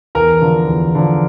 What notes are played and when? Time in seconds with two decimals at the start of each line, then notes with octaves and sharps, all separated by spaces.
0.15 E2 A#4
0.42 D3 F3
0.68 E2
0.95 D3 F3